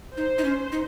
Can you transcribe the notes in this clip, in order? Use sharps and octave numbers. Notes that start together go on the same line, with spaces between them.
D#4 C5
D#4
C#4
D#4